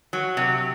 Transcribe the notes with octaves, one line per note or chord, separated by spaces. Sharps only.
F#3
C3